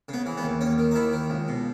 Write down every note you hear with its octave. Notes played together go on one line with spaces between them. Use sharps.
C#3 B3
E3
B3
D#2
D#2 C#4
D#3
D#4
D#2 E4
D#3
C#2
B2